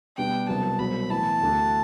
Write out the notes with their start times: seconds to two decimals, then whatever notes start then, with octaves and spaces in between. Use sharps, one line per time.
0.17 B2 G3 B3 D4 G5
0.48 C2 C3 F#3 B3 A5
0.79 C2 B2 F#3 C4 B5
1.10 A2 E3 B3 E4 A5
1.41 D2 D3 A3 D4